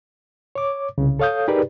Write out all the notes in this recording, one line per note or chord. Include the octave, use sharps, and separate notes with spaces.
C#5 D6
C2 C#3
A4 C#5 F5 D#6 G6
D#4 G4 G#4 A#4 B4 D5